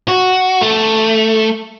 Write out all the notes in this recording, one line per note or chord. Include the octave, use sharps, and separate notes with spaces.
F#4
A3